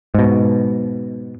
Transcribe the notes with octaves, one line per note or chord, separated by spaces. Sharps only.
G#2 B2